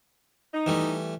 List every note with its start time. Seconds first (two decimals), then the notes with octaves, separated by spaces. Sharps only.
0.54 D#4
0.66 E3 G3 A3